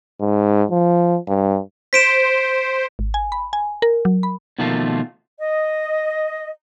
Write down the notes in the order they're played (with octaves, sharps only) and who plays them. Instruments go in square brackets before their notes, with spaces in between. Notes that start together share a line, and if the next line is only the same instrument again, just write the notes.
[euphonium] G#2
F3
G2
[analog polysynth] C5 [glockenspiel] B6 D7 E7
[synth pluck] G#1
G#5
B5
G#5
A#4
F#3
B5
[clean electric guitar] B2 D#3 F3 A3 A#3 F4
[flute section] D#5